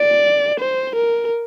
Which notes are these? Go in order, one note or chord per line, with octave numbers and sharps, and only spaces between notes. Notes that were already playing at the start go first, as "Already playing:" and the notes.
Already playing: D5
C5
A#4